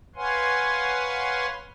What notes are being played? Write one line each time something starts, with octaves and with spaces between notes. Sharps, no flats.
B4 C#5 F5 F#5 G#5 C6